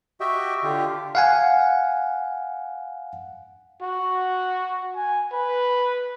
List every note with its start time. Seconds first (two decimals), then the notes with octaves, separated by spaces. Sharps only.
0.20 F#4 G4 D#5 E5 G5
0.64 D3 F4 G4
1.15 F5 F#5 G#5
3.82 F#4
4.96 G#5
5.32 B4